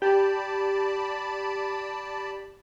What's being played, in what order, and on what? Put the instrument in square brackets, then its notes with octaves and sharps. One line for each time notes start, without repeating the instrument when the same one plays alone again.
[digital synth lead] G4 [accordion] D5 A5 B5